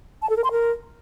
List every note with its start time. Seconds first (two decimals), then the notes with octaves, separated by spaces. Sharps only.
0.22 A5
0.29 A4
0.37 A#4
0.44 C6
0.51 A#4